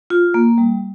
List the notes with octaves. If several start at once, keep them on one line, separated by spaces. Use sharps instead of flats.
F4
A#3
G3